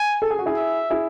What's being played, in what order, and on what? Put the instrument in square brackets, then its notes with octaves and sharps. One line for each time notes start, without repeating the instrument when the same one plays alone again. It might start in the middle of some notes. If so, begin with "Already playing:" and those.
Already playing: [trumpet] G#5
[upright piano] A4
G#4
F#4
E4 G#4
[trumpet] E5
[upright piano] E4 G#4